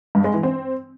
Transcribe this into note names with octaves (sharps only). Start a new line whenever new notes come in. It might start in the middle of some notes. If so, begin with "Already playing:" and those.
G2
G#3
E3
C4